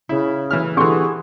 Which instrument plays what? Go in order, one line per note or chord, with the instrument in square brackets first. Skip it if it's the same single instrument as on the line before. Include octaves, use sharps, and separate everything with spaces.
[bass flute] C#3 [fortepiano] E4
[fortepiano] E3 E4 F6
[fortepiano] D3 E3 [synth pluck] G4 C6 C#6 [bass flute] G#4